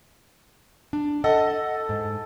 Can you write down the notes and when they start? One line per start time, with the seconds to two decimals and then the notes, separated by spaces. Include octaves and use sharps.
0.93 D4
1.24 A4 D#5 F#5
1.89 G#2